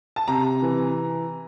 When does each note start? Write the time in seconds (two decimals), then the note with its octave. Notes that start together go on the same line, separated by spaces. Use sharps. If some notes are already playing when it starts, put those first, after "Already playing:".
0.16 A5
0.28 C3 A#5
0.62 E3